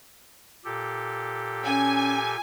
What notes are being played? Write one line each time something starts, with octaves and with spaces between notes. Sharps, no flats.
A#2 G4 A4
C#4 G#5